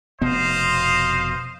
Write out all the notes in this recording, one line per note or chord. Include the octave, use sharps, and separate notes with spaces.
F1 B2 B3 C5 D#5 F5